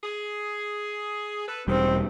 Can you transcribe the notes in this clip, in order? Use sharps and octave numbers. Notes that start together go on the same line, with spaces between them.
G#4
A4 B4
E1 D#3 G3 C4